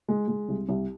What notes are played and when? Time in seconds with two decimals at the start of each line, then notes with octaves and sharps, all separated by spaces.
0.08 G#3
0.28 G#3
0.49 C2
0.69 C2